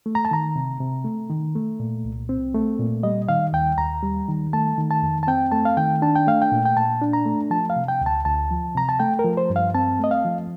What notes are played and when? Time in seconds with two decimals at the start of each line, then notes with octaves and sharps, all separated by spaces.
0.06 A3
0.15 A#5
0.25 A5
0.31 D#3 A#5
0.56 C3
0.81 C3
1.05 A3
1.30 D#3
1.55 A3
1.80 A#2
2.05 C2
2.29 C4
2.54 A3
2.79 A#2
3.03 G3 D#5
3.29 D#3 F5
3.53 D#2 G5
3.78 D#2 A#5
4.03 G3
4.28 D#3
4.53 A3 A5
4.78 D#3
4.91 A5
5.03 F2
5.23 A5
5.27 C4 G5
5.52 A3 A5
5.65 F5
5.77 D#3 G5
6.02 D4 A5
6.16 G5
6.27 A3 F5
6.42 G5
6.52 A#2
6.65 G5
6.77 A#2 A5
7.02 D4
7.13 A#5
7.25 A3
7.50 F3 A5
7.70 F5
7.76 C3
7.88 G5
8.01 D2
8.06 A5
8.25 D2 A5
8.51 F3
8.75 C3 A#5
8.89 A5
9.00 A3 G5
9.19 A#4
9.25 F3
9.37 C5
9.50 G2
9.56 F5
9.74 C4 A5
9.99 A3 D#5
10.11 F5
10.25 F3